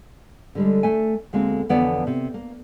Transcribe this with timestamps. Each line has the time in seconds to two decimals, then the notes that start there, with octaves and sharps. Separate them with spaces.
0.55 D3 G3 G#3
0.83 A3 E5 G#5
1.33 D2 G#3 A#3 C4
1.69 F2 D3 E3 B3 C#5 D5
2.07 C3
2.34 A#3